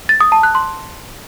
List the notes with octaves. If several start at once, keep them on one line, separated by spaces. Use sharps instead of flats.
A6
D#6
A5
F#6
C6